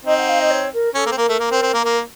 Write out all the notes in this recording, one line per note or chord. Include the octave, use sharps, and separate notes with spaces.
C4 D#4 D#5
F#5
F5
D#5
C#5
A#4
C#4 A4
A#3
C4
A#3 A#4
A3
A#3
C4
C4
A#3
A#3